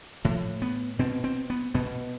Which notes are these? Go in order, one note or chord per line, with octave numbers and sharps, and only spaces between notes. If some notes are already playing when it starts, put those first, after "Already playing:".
A2 F3
B3
B2 C4
C4
B3
B2 B3